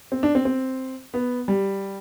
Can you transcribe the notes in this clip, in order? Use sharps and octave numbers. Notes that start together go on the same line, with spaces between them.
C4
D4
C4
C4
B3
G3